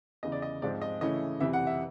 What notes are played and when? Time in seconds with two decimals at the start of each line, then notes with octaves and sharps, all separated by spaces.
0.23 E2 C#3 E3 D#5
0.32 D5
0.42 D#5
0.62 G#2 F3 G#3 C4 D5
0.82 D#5
1.01 C#3 E3 A3 C#4 E4 D#5
1.40 F2 C3 E3 E5
1.53 F#5
1.67 E5